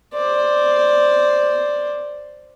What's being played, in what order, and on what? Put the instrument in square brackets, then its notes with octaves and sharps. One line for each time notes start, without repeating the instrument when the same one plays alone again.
[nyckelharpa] C5 D5